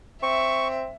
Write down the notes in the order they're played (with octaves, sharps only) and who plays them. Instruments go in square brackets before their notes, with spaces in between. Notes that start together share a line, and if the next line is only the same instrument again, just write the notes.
[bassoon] C4 [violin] E5 [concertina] C#6